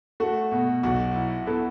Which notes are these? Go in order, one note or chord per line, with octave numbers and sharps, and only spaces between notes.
A3 F#4
B2
B1 F#4
E4
B3 E4 A4